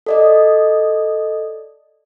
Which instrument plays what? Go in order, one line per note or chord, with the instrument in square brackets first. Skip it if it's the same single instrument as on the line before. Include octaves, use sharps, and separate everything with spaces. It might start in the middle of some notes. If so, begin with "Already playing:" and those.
[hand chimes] A4 D5 D#5